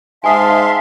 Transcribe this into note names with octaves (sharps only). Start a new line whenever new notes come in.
G#2 E5 F5 G#5 A5 C6 D#6